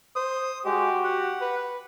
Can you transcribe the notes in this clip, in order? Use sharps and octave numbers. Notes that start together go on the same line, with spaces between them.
C5 D#6
G#3 F#4 G4
F#5
B4